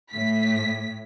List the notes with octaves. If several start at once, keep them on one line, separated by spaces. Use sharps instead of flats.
A2 B6